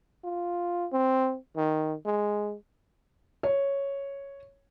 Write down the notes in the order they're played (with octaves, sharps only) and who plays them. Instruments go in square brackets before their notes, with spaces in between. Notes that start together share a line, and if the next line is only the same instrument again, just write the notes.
[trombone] F4
C4
D#3
G#3
[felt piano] C#5